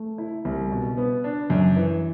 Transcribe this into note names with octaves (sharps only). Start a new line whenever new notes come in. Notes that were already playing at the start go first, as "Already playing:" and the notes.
Already playing: A3
E4
C2
B2
B3
D4
F#2
E3